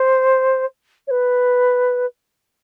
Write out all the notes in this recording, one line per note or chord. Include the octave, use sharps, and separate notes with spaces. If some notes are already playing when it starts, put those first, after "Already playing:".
Already playing: C5
C#5
B4